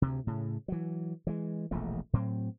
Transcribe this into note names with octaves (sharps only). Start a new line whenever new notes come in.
D2 C3
A2 C#3
E3 F#3
E3 G#3
E1 A#1 E2 A3
A2 F#3 C4